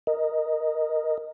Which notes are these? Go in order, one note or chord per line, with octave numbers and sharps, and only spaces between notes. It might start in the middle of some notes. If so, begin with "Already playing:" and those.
A#4 D#5